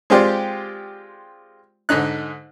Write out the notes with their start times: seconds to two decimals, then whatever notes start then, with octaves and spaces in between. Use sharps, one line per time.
0.10 G#3 C4 F4 G4 D5
1.89 G#2 D3 D#4 F#6